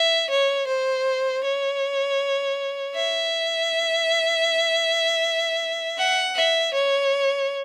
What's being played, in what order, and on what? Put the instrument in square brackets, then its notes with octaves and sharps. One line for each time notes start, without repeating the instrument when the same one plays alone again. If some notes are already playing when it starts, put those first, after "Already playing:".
Already playing: [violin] E5
C#5
C5
C#5
E5
F#5
E5
C#5